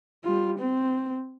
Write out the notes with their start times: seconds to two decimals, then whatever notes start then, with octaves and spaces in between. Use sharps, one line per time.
0.24 G3 F4
0.59 C4